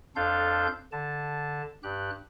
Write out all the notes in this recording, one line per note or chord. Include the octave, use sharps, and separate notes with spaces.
F2 D4 F4 A4 F5 G6
D3 A5
G2 G4 F#6